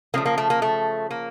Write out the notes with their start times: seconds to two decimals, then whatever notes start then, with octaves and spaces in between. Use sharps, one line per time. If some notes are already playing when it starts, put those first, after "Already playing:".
0.14 C#3 F3 A3 A#3
0.26 A#3
0.38 A3
0.50 A#3
0.62 A3
1.11 A#3